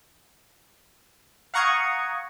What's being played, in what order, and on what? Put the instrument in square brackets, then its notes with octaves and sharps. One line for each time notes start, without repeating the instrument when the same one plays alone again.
[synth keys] F5 F#5 A#5 C#6 D#6 G#6